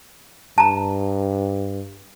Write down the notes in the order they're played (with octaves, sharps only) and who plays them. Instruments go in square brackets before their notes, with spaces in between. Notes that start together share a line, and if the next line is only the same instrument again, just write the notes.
[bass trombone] G2 [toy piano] A5 A#5